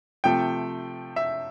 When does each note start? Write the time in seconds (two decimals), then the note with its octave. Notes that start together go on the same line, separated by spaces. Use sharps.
0.24 C3 F3 A3 G5
1.16 E5